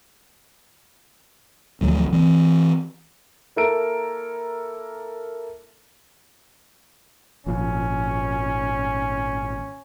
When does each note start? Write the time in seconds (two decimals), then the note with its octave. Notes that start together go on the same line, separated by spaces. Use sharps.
1.81 A1 D2 F3 F#3
2.13 E3 C4
3.56 A#3 E4 A4 A#4 D7
7.46 G#1 A#2 F3 C#4